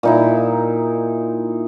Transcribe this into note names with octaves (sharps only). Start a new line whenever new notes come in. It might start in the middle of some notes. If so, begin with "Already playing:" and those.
A#2 D#4 E4